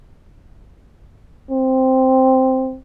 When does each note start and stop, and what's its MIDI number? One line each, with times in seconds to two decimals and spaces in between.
1.51 2.77 60